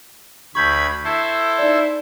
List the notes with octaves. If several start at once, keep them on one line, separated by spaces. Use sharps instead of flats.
D2 B5 C#6 G6 G#6 B6
E4 A4 C5
D#4 D5